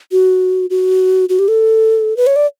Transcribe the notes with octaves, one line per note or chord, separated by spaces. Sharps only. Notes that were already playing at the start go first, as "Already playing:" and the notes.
F#4
F#4
F#4
G4
A4
B4
C#5
D5